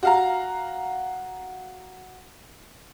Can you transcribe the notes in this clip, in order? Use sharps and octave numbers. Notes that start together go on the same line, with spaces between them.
F#4 F5 A#5